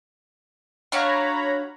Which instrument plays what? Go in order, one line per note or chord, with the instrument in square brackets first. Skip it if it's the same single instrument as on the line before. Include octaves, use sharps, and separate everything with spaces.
[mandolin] D4 F#4 F5 [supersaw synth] C#5 A#5 B5